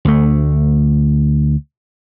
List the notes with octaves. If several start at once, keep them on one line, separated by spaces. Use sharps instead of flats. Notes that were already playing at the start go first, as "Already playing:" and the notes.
D2 A3